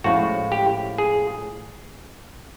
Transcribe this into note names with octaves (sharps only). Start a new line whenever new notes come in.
A2 F3 G#3 C#4 F4 F#4
G4
G#4